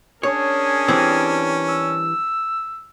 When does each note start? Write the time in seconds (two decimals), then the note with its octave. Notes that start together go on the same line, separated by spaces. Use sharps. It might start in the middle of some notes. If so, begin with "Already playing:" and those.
0.23 C#4 D4 G#4 A#4 C#5
0.88 E3 G3 C4
1.69 E6